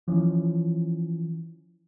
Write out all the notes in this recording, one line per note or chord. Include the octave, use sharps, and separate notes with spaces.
E3 F3 C#4